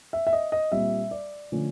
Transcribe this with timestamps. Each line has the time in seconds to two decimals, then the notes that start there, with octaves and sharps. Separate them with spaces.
0.13 E5
0.27 E5
0.33 D#5
0.52 D#5
0.72 A#2 G3 C4 E5
1.11 D5
1.52 D3 F3 A3 C#4